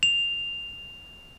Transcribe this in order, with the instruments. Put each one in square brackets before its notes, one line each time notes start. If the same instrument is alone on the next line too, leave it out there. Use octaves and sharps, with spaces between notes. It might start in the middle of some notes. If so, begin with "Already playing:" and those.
[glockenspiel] F7